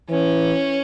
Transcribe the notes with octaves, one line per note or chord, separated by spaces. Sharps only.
E3 C#4